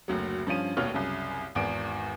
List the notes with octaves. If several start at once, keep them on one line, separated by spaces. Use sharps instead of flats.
F#1 D2 F#3
G2 F3 C#4 D#7
F1 D#2 B2 C#5 F6
C2 F#2 C#3
G#1 E2 D7